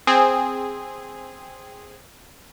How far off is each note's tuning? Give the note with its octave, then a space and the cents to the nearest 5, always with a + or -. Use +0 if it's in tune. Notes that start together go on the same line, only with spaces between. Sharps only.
C4 +0 G#4 -10